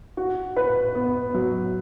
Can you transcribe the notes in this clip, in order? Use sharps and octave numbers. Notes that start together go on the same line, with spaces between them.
F#4
B4
B3
F#3